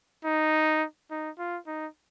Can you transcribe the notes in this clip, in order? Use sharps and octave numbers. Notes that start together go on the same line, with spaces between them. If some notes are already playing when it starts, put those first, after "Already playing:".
D#4
D#4
F4
D#4